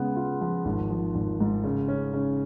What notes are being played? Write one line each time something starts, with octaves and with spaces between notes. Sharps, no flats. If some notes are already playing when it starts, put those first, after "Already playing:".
Already playing: C#3 G#3 B3
F4
F3
G#1
F3
G#1
G#2
C#3
C#4
C#3